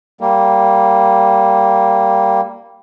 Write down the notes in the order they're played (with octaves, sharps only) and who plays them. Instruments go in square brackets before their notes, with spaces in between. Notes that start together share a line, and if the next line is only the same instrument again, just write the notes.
[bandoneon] G3 A#3